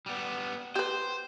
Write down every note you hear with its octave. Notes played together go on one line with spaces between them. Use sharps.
G3 B3
G4 B4 C5